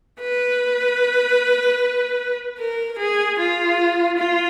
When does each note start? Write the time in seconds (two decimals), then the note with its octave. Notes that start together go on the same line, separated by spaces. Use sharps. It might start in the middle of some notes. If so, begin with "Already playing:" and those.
0.21 B4
2.59 A#4
2.98 G#4
3.39 F4
4.18 F4